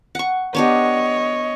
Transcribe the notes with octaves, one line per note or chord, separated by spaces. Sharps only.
F#5 C#6
B3 D4 G4 C#5 D#5